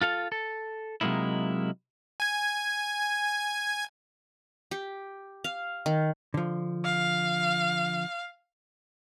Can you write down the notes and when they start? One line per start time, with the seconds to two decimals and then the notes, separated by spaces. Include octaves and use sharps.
0.01 F4 A4 F5
0.32 A4
1.01 C3 F#3 G#3 A#3 D#4 E4
2.20 G#5 G#6
4.71 G4
5.44 F5
5.86 D#3
6.34 D3 F3
6.84 F5